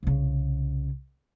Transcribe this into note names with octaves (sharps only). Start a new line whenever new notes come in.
C2 C#3